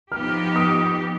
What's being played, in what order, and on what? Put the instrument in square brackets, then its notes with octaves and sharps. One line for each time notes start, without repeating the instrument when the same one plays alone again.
[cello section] F3 B3 D#4 G4 [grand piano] F6
[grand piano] D#6